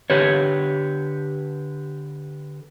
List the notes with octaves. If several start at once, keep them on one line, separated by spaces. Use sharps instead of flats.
D3 G4 B4 C#5